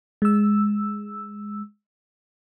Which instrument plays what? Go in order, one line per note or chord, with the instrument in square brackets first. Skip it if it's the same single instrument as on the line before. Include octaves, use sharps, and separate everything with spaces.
[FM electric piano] G#3 E6